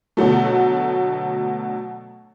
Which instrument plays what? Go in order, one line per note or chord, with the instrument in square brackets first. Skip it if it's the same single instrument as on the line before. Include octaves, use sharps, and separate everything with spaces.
[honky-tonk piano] B2 D3 F#3 A3